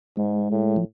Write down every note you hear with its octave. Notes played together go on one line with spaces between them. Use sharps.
G#2 G#3
A2
F3